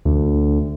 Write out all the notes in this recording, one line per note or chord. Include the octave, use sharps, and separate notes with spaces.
D2